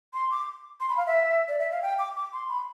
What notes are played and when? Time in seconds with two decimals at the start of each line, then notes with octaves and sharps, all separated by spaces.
0.14 C6
0.31 D6
0.80 C6
0.89 B5
0.97 F5
1.07 E5
1.48 D5
1.59 E5
1.71 F5
1.82 G5
1.99 D6
2.16 D6
2.33 C6
2.49 B5